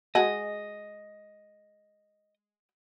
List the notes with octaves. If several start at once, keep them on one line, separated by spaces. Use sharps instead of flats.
G#3 F#4 G#4 D#5